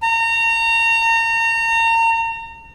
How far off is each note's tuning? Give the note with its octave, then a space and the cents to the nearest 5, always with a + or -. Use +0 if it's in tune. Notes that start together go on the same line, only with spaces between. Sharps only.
A#5 -35